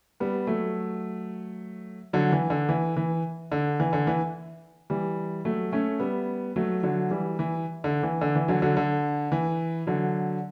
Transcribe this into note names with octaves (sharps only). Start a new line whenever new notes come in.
G3 B3
F#3 A3
D3 F#3
E3
D3
E3
E3
D3
E3
D3
E3
E3 G3
F#3 A3
A3 C#4
G3 B3
F#3 A3
D3 F#3
E3 G3
E3
D3
E3
D3
E3
D3 F#3
D3 F#3
D3
E3
D3 F#3